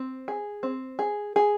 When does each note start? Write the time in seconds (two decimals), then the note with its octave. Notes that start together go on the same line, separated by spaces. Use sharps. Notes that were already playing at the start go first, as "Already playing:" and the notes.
Already playing: C4
0.28 G#4
0.63 C4
0.99 G#4
1.36 G#4